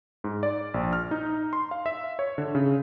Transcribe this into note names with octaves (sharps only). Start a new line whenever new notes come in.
G#2
D5
A#1
F6
D#4
C6
F5
E5
C#5
D3
C#3